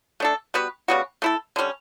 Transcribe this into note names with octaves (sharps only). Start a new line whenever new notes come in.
A3 D4 A4
G3 B3 F#4 B4
C#3 G3 B3 F#4
A3 E4 A4
D3 G3 C#4